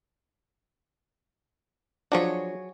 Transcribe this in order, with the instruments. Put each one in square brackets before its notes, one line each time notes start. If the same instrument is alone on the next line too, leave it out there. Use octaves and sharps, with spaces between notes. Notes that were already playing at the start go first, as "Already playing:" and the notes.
[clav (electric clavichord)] F3 D4 [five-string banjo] F#3 G#4 C#5